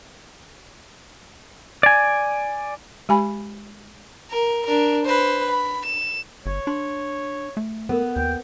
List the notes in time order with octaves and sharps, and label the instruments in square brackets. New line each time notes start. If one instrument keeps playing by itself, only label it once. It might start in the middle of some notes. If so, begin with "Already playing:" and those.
[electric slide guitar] D5 G#5
[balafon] G#3 G4 G#5 B5
[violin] A#4
D4 A#4
B4 C5
B5
E7
[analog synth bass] G1 [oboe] C#5
[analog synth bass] D4 [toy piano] C6
[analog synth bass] A3
[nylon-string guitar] B3 [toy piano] A4 A#4
[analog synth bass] D#2 [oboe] G5